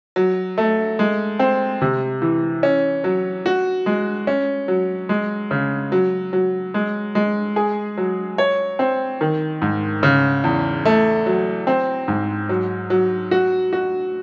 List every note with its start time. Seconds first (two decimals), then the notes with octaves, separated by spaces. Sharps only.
0.16 F#3
0.58 A3
0.99 G#3
1.39 C4
1.81 C3
2.22 E3
2.63 C#4
3.04 F#3
3.46 F#4
3.86 G#3
4.27 C#4
4.68 F#3
5.09 G#3
5.51 C#3
5.92 F#3
6.33 F#3
6.74 G#3
7.15 G#3
7.56 G#4
7.97 F#3
8.38 C#5
8.79 C4
9.21 D#3
9.62 G#2
10.03 C#3
10.44 E2
10.85 A3
11.26 F#3
11.67 C4
12.08 G#2
12.49 F#3
12.90 F#3
13.31 F#4
13.73 F#4